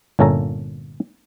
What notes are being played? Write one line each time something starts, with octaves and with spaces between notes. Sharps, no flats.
G1 A#2 C#4 A4 A#5